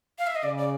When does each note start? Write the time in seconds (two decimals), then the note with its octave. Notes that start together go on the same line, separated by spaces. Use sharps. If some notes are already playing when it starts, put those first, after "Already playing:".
0.19 F5
0.27 E5
0.35 D#5
0.43 C#3 D5
0.58 D5